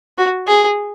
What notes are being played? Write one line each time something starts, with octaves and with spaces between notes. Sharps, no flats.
F#4
G#4